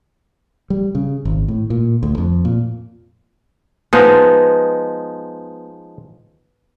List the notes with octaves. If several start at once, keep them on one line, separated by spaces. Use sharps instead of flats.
G3
C#3
G#1
A2
A#2
D2
F2
A#2
F3 G#3 B3 D#4